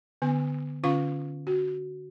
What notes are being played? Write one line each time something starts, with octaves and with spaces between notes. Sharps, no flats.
D3 B3 G#5
D3 C#4 F4 F5 C#6
F#4